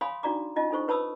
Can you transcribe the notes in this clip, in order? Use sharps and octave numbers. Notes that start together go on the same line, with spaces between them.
C#5 F5 G#5 B5 C6 D#6
D4 D#4 F#4 D5 A#5 D6
C#4 D#4 F4 D#5 A5
D4 D#4 A4 C5 C#6
B4 C#5 A5 B5 D#6 E6